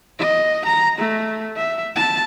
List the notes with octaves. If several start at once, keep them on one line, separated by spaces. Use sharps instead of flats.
D#5
A#5
A3
E5
A5